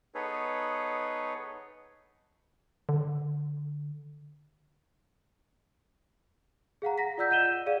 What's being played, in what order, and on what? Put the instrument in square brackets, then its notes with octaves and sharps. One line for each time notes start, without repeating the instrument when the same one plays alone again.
[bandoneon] B3 D#4 G#4 A4 B4 C#5
[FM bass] D3
[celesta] G#4 F5 F#5 A#5
F#5 A#5 A#6 B6
F4 D5 F#5 E6 G6 B6
D#5 F#5 G6 D#7 E7 G7
F#5
G#4 D5 F5 D#7